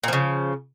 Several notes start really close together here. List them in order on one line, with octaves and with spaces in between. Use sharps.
A#2 F3 C#3